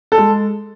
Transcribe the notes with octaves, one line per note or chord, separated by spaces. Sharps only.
A4
G#3